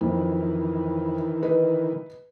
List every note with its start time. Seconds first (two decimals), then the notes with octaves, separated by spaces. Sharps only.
0.01 F2 D#3 E3
1.43 B4 D#5